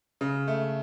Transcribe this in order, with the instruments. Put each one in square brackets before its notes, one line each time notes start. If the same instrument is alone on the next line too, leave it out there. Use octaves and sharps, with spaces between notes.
[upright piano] C#3
A3